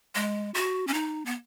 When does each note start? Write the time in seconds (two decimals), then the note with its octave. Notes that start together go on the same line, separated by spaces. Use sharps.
0.15 G#3
0.54 F#4
0.87 C#4
0.94 D#4
1.26 B3